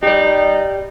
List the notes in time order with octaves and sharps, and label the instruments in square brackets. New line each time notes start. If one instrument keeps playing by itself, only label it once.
[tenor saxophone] D#4 [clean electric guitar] G4 D5